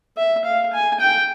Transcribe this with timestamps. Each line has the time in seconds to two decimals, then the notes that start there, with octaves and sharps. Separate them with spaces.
0.17 E5
0.45 F5
0.73 G#5
1.00 G5